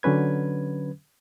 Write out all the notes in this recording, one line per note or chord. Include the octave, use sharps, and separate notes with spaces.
D3 F#3 C#4 B4 G#6